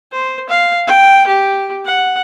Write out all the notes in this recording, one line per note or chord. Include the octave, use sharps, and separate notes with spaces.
C5
F5
G5
G4
F#5